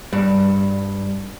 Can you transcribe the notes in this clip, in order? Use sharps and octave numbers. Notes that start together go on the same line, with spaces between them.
G2 G3